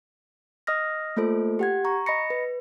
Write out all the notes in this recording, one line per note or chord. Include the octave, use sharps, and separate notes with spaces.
D#5 D#6 F6 A#6
A3 A#3 F4 A4 C5
G4 F#5 G#6
A#5 C#6
D#5 B5 A#6 C#7
B4